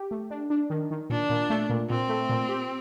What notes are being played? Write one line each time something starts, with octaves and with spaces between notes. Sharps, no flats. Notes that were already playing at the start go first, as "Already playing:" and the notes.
Already playing: G4
A3
D4
D4
D#3
D#3
A#2 D4
A#2
A3
A#2
A#2 C4
A3
A#2
G4